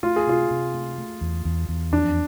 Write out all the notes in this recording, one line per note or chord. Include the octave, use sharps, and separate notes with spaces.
A3 F4
G#4
C3 F4
C3
A3
A3
E2
E2
E2
F2 D4